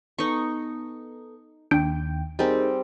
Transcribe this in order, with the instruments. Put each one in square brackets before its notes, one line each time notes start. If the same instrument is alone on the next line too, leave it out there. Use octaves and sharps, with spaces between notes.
[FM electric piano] B3 A4 [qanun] D#4 C#6
[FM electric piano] D#2 G5 [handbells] D4 G6 D7
[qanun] G3 C4 [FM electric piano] D#4 G#4 A#4